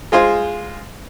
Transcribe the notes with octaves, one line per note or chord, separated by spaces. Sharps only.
G#3 F4 G#4 C5